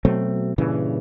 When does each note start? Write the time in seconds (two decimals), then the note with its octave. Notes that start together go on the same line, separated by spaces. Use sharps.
0.05 B2 F#3 A3 C4
0.58 G2 A#2 C#3 E3